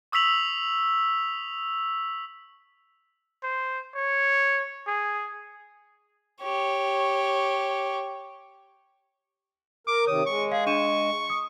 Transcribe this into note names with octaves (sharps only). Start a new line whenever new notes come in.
C#6 D#6 E6 B6 F7 F#7
C5
C#5
G#4
G4 C#5
A#4 D6
C3 D#3 C#5 D#6
G#3 C#6
G#4 F5
D4 C#6 D#7 E7
D#6